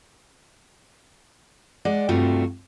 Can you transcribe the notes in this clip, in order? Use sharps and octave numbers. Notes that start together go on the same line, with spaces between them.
G#3 D5 F#5
G2 C3 G3 A3 F4 F#4